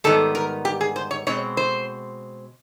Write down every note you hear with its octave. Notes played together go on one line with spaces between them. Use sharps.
G#2 D#3 G3 B3 A4
A#4
G4
G#4
C5
C#5
B2 G#3 C4 C#5
C5